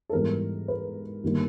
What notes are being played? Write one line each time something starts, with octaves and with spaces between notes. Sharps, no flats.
A4
G#2 E3 G3 B3 A#4
B4
G1 D#3 G3 A#3